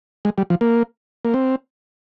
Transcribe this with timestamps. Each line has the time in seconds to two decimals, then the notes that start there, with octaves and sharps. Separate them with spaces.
0.25 G#3
0.38 G3
0.50 F3
0.61 A#3
1.25 A#3
1.34 C4